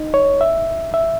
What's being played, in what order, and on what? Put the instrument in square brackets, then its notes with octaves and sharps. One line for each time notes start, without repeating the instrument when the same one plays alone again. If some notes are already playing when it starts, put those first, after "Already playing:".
Already playing: [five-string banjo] D#4
[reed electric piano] C#5
E5
E5